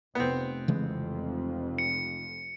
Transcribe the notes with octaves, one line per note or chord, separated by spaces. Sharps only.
F1 B3 C4
F1 F2 C#3 E3 G#3
C#7